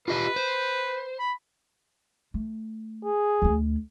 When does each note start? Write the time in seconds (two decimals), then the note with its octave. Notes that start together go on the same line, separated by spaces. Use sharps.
0.08 F4 G4 B4 D#5
0.36 C5
1.19 B5
2.34 A3
3.05 G#4
3.42 D2 A3